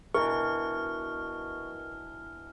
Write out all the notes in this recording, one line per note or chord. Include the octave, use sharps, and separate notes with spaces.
B2 E3 D4 A#4 C#6 F6